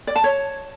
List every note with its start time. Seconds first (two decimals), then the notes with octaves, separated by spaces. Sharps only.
0.07 D5
0.16 A5
0.24 C#5